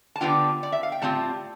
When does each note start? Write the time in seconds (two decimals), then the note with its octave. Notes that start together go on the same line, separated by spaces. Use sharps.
0.16 A5
0.21 D3 G3 B3 D4 F4 G5
0.63 D5
0.72 E5
0.83 F5
0.92 G5
1.02 A2 G3 C4 F4 A5